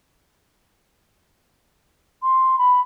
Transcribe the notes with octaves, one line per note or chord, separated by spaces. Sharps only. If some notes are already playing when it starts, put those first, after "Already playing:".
C6
B5